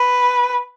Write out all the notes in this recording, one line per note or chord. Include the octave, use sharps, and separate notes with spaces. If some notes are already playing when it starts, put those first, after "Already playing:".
Already playing: B4